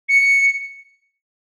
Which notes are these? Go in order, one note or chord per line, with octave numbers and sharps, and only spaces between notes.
C#7